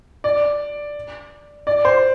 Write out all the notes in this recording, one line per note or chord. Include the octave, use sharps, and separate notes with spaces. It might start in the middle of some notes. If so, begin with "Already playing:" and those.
D5
D5
C5